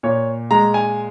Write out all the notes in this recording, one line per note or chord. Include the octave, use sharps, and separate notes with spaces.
A#2 C#5
G#3 A#5
G#5